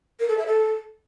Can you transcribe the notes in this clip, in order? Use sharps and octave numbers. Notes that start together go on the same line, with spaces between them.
A#4
A4
E5
A4